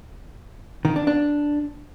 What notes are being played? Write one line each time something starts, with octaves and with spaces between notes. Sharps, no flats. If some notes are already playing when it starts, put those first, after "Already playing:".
D#3
D4
D4